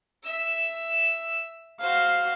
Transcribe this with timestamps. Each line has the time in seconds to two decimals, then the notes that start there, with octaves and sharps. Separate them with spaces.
0.23 E5 E6
1.80 F#4 C5 F5